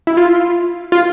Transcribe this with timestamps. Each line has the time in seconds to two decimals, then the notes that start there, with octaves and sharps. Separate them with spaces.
0.07 E4
0.17 F4
0.92 F4